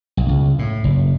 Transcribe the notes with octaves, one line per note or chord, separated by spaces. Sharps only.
B1
C#2
A2
F#1